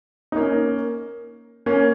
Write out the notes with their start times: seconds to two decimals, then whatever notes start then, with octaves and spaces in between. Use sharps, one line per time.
0.32 D#4
0.36 A#3 C#4
1.66 A#3 C#4